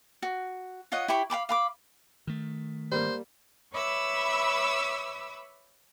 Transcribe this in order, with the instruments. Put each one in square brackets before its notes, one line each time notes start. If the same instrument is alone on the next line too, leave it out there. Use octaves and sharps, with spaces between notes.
[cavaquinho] F#4
F4 C#5 D#5 F#5
E4 G4 B5 C#6
F5 G5 B5 D6
F5 B5 D6
[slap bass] D#3 A3
[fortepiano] G3 A#3 [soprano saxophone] C5
[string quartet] B4 C#5 E5 B5 D6 E6